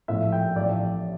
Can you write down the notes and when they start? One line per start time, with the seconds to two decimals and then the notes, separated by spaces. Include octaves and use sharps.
0.08 A#1 A2 F3 E5
0.32 G5
0.56 A1 A2 F3 D5